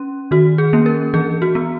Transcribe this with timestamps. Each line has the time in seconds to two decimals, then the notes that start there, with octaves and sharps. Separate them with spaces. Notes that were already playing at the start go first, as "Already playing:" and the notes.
Already playing: C#4
0.31 D#3 F#4
0.58 G#4
0.73 A#3 C#4
0.86 A#4
1.14 E3 G#4
1.42 F#4
1.55 B3